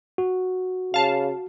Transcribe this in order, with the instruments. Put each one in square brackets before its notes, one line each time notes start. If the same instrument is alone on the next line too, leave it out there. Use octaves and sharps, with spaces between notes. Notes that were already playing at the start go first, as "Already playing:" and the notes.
[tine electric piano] F#4
[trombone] C#3 [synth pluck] F5 A5